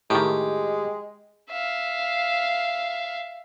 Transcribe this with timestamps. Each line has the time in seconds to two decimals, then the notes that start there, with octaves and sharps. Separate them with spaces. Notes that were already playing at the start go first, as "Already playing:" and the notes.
0.10 A2 D#3 G#3 G4
1.50 E5 F5